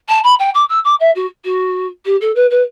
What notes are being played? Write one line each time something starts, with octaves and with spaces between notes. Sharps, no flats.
A5
B5
G5
D6
E6
D6
E5
F#4
F#4
G4
A4
B4
B4